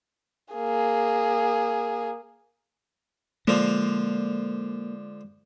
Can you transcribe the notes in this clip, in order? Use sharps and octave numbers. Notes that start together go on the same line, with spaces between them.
A#3 G#4
D3 F3 G#3 A#3